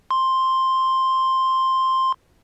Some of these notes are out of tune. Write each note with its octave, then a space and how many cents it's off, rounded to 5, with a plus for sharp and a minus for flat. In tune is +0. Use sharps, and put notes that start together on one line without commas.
C6 +5